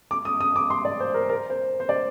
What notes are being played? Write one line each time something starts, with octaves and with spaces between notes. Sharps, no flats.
D6
D#6
D#6
D6
C6
D5
C5
A#4
A#4
C5
C5
D5